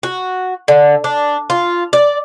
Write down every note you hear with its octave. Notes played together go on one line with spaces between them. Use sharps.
F#4
D3
D4
F4
D5